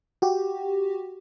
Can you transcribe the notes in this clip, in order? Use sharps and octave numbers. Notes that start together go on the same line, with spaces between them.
F#4 G4